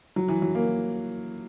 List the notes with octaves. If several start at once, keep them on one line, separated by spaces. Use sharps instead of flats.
F#3
E3
F#3
A#3